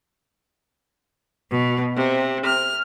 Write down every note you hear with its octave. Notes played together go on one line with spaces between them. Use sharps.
B2
C3
F6